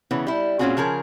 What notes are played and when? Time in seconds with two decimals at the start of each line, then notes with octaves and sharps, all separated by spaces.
0.11 C#3 E3 B3
0.27 G3 E4
0.59 A#2 C4 C#4 F4 F#4 G#4
0.77 C#3 F3 G#4 A#4